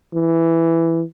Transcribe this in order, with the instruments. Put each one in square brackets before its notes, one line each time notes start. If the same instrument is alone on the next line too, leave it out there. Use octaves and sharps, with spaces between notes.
[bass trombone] E3